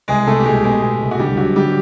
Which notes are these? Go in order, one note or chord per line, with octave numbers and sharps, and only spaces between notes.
C2 G#3 G#4
C2 A3 A4
G4
B2 G#3 G#4
G#3 B3 G#4
B2
C2
F#4
D3 G3 G4
D3 F#3 F#4
D3 G3 G4